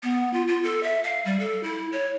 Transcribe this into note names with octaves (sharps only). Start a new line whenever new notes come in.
B3
F4
F4
A4
E5
F5
G3
A4
E4
C#5